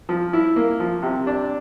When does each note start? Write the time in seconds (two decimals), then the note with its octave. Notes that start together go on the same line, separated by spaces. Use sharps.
0.09 F3
0.33 E4
0.56 A#3
0.80 F3
1.02 C3
1.27 D4